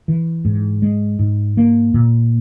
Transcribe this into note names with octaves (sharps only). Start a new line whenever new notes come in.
E3
G#2
G#3
G#2
A#3
A#2